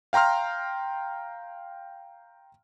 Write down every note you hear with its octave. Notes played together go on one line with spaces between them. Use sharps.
F5 G5 A#5 C6 F6